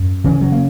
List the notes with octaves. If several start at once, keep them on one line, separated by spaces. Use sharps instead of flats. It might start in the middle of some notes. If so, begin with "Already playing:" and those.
Already playing: F#2
C#3 E3
F#3
A#3